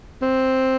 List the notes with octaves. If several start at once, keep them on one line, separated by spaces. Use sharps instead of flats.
C4